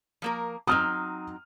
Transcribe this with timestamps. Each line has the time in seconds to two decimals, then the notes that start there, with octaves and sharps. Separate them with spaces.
0.22 F3 A#3 A#4
0.67 F#3 C4 D#4 D#6 F6